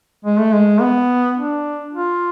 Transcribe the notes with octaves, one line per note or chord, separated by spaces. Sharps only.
G#3
A3
G#3
B3
D4
F4